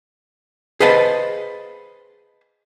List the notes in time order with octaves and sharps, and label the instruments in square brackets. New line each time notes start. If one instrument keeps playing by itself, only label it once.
[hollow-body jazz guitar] G#4 B4 C5 D#5 F5 A5